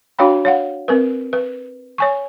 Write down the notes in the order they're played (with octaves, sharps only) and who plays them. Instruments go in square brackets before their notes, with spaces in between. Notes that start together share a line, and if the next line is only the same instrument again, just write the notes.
[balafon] D4 F#4 C#5 F5 G5 B5
C#5 F5 F#5
C4 A#4 B4
B4
C#5 G#5 C#6